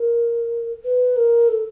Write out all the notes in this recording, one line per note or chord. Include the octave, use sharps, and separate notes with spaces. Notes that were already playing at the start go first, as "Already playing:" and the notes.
Already playing: A#4
B4
A#4
A4